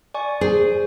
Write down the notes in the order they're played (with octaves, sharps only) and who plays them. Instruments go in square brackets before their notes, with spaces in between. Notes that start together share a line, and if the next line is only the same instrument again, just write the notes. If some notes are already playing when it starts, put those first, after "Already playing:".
[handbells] D5 G#5 C#6
[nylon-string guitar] G#4 [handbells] C5